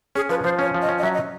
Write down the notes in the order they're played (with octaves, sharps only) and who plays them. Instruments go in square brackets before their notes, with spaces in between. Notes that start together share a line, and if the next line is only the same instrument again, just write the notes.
[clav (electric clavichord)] C#4 [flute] G#4
[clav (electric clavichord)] F3 [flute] B4
[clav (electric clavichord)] F3 [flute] C5
[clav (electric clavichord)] C#4 [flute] C#5
[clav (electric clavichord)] F3
[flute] D#5
[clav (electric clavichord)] C#4
[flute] D#5
[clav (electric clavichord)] F#3 [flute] E5
[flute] D#5